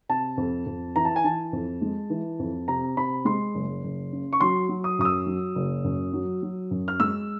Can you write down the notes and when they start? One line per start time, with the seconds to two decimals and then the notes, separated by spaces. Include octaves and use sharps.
0.09 C3 A5
0.37 F2
0.66 F2
0.96 E3 A#5
1.05 A5
1.16 G#5
1.24 E3 A5
1.53 F2
1.82 G#3
2.10 E3
2.39 F2
2.68 C3 A#5
2.97 C3 B5
3.25 G#3 C6
3.55 F#1
3.84 F#1
4.12 C#3
4.33 C#6
4.41 F#3 C6
4.69 F#3
4.84 D#6
4.99 F#2 D#6
5.05 E6
5.26 F#3
5.55 F#1
5.84 F#2
6.13 F#3
6.43 F#3
6.71 F#2
6.88 F6
7.00 G#3 E6